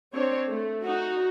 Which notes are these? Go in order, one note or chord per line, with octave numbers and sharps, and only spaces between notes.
C4 D4 C#5
A3
D#4 F#4